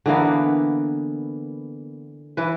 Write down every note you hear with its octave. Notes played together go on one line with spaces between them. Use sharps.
D3 E3 A#3 B3
E3 B4